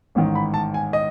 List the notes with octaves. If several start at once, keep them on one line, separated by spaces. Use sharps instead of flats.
A1 G#2 D#3
B5
A5
G#5
D#5